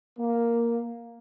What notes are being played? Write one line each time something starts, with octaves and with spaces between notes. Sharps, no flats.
A#3